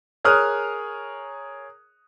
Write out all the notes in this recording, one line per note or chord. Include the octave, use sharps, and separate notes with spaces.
G#4 A#4 C#5 D#6 F6 F#6